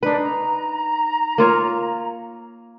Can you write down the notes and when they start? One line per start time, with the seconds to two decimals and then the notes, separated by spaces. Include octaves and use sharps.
0.03 D4 D#4 B4
0.22 A#5
1.38 A#3 F4 C#5